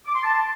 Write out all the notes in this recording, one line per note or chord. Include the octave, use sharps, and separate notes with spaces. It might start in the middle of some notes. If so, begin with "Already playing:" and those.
D6
C6
A5